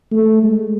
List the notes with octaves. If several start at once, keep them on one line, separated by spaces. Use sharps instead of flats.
A3
G#3